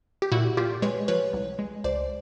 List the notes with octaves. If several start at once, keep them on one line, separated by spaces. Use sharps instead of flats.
G4
A#2 E4 F#4
A#2 F4 G4
G#3 B4 C#5
F3 B4 C#5
C2
G#3
C#2 C5 D5